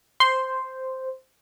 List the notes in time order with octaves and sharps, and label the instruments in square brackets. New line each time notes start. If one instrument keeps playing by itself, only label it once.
[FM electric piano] C5 [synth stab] C6